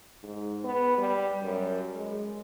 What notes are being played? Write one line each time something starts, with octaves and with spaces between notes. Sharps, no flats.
G#2
B3
G3
F#2
G#3